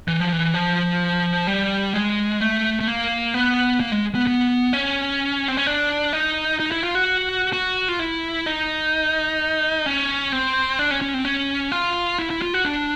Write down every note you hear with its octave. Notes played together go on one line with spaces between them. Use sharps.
E3
F3
E3
F3
G3
G#3
A3
A3
A#3
B3
A#3
G#3
B3
B3
C#4
C4
C#4
D4
D#4
D#4
E4
F4
F#4
F#4
F4
E4
D#4
C#4
C4
D4
C#4
C#4
C4
C#4
F4
E4
E4
F4
F#4
D4